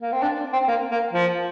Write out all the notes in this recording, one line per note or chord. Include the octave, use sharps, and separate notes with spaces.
A#3
C4
D4
C4
A#3
A#3
F3